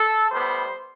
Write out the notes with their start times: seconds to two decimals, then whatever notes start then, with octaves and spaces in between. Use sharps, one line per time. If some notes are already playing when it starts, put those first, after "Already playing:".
Already playing: A4
0.31 A2 G3 B3 C5